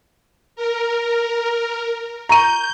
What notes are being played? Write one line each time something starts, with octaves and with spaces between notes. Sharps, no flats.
A#4
A#5 C#6 G6 D#7